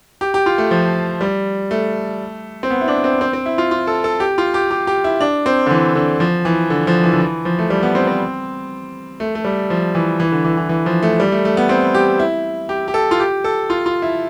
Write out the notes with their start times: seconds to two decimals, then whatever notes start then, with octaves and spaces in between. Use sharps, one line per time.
0.21 G4
0.34 G4
0.46 F4
0.58 A3
0.71 F3
1.21 G3
1.71 A3
2.63 C4
2.71 B3
2.81 E4
2.88 D4
3.04 C4
3.21 C4
3.33 C4
3.46 E4
3.58 F4
3.71 F4
3.87 A4
4.04 A4
4.20 G4
4.38 F4
4.54 G4
4.71 G4
4.87 G4
5.04 E4
5.21 D4
5.46 C4
5.66 D3
5.71 E3
5.95 D3
6.20 F3
6.45 E3
6.70 D3
6.87 F3
7.04 E3
7.13 D3
7.20 E3
7.45 F3
7.59 A3
7.70 G3
7.83 B3
7.95 C4
8.07 C4
9.20 A3
9.35 A3
9.45 G3
9.70 F3
9.95 E3
10.20 E3
10.32 D3
10.45 E3
10.57 E3
10.69 E3
10.86 F3
11.02 A3
11.20 G3
11.32 A3
11.45 A3
11.57 B3
11.69 C4
11.94 G4
12.20 E4
12.69 G4
12.88 G4
12.94 A4
13.11 F4
13.20 G4
13.44 A4
13.70 F4
13.86 F4
14.02 E4